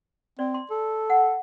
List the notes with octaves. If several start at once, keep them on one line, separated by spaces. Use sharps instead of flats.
C4 D5
C6
A4
F#5